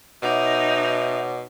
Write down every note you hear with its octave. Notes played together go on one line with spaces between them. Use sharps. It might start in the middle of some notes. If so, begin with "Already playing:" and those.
B2 D#4 C#5 E5 F#5 D6